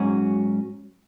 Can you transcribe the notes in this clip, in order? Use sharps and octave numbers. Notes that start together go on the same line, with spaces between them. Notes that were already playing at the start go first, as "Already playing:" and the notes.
Already playing: G#2 F#3 C#4 F#4